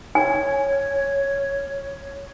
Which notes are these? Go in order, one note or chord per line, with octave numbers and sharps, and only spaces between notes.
C#5 G#5